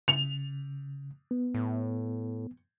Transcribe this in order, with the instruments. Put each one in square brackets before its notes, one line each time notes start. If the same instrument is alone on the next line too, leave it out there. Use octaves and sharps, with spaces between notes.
[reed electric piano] C#3 [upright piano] F7
[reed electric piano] B3
[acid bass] A2